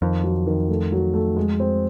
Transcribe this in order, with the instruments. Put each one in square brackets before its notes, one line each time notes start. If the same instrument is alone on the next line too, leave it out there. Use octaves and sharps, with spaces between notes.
[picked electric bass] F2 [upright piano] D#3
[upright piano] F#3
D#3
A3
F#3
A3
G#3
C4